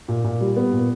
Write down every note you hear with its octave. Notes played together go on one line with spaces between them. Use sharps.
A#2
A#2
G3
B3
A#2